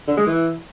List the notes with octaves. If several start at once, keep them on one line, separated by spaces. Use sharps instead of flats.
D3
G#3
E3